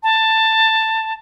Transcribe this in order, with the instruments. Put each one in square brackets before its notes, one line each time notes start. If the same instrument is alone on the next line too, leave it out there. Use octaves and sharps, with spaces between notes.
[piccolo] A5